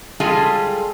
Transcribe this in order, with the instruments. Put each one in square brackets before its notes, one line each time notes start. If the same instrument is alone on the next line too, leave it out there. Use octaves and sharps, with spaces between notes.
[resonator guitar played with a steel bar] G3 G#3 F4 G#4 A4